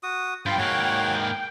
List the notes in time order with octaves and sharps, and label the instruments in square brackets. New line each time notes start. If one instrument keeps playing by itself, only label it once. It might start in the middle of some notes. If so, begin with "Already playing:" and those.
[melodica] F#4 D#6
[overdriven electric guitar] G2 [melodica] F4 [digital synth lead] G5
[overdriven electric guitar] G#2 A#3 [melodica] F#4 C#5